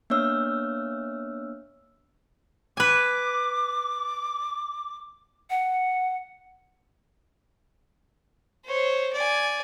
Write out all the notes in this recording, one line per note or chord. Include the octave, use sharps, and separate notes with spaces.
A#3 B3 D4 C#5 E6 F6
B4 G#5 D6
F#5
C5 C#5
D5 G#5